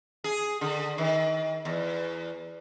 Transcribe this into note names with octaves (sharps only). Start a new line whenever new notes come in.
G#4
D3
D#3
E2